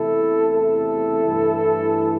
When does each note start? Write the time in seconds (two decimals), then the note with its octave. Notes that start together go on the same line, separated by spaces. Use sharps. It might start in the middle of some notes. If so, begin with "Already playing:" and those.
Already playing: E2 C3 A3 E4 A4
0.54 E4 A4
1.25 G2 E3 A3